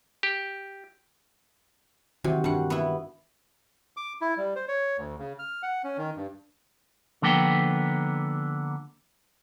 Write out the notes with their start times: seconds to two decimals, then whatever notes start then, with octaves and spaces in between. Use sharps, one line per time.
0.23 G4
2.24 C3 D#3 E3 F#4
2.44 G2 F#4 F#5
2.70 B3 E4
3.97 D6
4.21 E4
4.37 G3
4.56 C5
4.68 C#5
4.98 D2
5.19 C#3
5.39 F6
5.63 F#5
5.84 C#4
5.98 D#3
6.17 G2
7.22 D3 F3 A#3 B3 G5